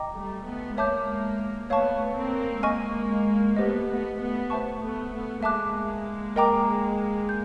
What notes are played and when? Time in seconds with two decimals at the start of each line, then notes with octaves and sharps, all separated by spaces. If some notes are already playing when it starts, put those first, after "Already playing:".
Already playing: D#5 G5 A#5 D6
0.15 G3 A3
0.46 A3 B3
0.77 G#3 A#3 C#5 E5 A5 D6 G6
1.70 A3 B3 C#5 F5 A5 C#6
2.16 A#3 C4
2.63 G#3 A#3 D#5 G#5 C#6 F6
3.56 A3 B3 G4 C5 D#5
3.88 A3 B3
4.18 A3 B3
4.50 C5 E5 A5 C#6
4.81 A3 B3
5.11 A3 B3
5.43 G#3 A#3 E5 A5 D6 F#6
6.36 A#4 D#5 G5 A#5 D6
7.29 G6